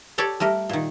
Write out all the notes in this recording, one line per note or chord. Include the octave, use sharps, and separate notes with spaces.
G4 A4 C#5 D5
G3 A3 A#4
A#2 D#3